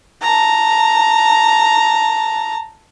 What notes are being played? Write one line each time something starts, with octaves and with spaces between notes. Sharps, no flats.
A5 A#5